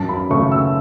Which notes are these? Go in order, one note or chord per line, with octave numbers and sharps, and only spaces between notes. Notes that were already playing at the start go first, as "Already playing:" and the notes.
Already playing: F#2 A5
B5
C#3 A3 C#6
E6